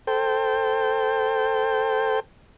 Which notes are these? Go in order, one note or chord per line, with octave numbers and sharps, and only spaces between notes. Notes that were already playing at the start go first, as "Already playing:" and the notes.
A4 C5 G5